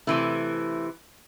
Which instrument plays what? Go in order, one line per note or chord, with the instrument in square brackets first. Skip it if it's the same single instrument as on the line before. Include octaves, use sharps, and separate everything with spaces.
[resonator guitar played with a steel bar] C3 E3 A3 E4